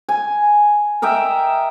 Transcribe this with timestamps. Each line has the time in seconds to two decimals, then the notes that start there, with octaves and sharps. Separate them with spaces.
0.09 G#5
1.02 A#4 D#5 E5 G5